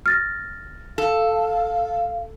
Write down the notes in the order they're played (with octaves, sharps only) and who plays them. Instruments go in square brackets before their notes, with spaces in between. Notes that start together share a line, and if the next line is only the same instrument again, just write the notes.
[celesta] F6 A6 A#6
[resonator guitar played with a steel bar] A4 [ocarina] F5